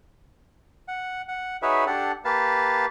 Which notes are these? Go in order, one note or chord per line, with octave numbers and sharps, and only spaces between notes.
F#5
F#5
D#4 F#4 G#4 B4 C#5 E5
D4 G4 A4 F#5
A#3 G4 B4 F5 A5